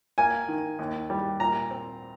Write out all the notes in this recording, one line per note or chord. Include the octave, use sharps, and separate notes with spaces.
A#3 G#5
D#3
D#2
G3
A#2 A#5
C4